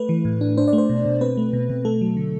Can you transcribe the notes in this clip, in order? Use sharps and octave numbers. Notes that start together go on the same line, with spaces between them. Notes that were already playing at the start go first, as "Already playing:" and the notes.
Already playing: A3 B4
E3
A2
D4
D4 C5
D5
A3
C5
B2
B2
C4 B4
A3
B2
B2
A3 A4
F#3
D3